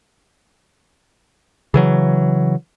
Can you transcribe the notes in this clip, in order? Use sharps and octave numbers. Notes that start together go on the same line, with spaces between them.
C#3 E3 F#3